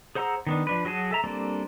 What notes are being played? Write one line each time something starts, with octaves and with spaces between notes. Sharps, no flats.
G#4 C5 F#5 A#5 E6
D#3 B3 D4
F3 D4 B4
F#3 F#4 G#4 G#5 A5
A4 E5 A#5
G3 A#3 C4 D4 A4